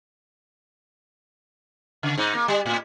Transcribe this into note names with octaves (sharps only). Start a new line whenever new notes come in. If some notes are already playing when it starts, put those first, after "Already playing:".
C#3
G#2 D#4
A#3
G3
A2